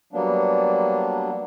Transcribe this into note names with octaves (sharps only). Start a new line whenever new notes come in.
F#3 G3 A#3 B3 D4